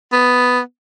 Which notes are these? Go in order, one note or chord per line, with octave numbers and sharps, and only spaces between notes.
B3